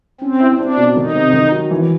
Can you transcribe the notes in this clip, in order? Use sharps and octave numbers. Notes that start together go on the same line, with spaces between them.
C4 C#4
E4
C4 D4
B2
D#3 D#4
C3
D#3
F#3
E3